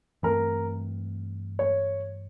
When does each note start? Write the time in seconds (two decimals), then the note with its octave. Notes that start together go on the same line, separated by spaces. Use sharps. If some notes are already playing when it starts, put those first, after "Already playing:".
0.23 G2 E3 A3 C4 A#4
1.59 C#5